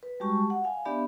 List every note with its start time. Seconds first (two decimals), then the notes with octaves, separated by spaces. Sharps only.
0.03 B4
0.20 G3 G#3 F#4 G4 A5 C#6
0.50 F#5
0.64 F5 G#5
0.85 B3 D4 G4 D5 E5 B5